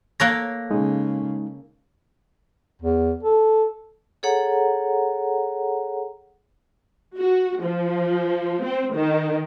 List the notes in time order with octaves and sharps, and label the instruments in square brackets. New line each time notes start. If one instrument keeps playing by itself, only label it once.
[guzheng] A#3 A4 C#5 [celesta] F#6 A#6
[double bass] C#3 [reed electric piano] G#3 D#4
[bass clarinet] E2
A4
[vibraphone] G#4 A4 C#5 F#5 A#5
[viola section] F#4
F3
C4
D#3